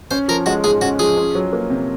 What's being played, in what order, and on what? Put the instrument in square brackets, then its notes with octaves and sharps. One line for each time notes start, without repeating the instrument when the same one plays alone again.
[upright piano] C#4 [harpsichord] C5
[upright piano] F3 [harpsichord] A#4
[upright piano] G#3 [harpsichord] F#4
[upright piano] G#2 [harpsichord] G#4
[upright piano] C#4 [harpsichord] F#4
[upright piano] F3 [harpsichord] G#4
[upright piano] C#4
F#3
A#3
C3